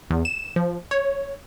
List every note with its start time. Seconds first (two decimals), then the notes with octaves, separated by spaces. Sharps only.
0.11 E2
0.25 E7
0.56 F3
0.91 C#5